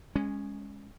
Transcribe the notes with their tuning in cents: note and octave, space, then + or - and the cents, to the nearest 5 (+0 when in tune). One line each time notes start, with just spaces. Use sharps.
G#3 -15 C#4 +0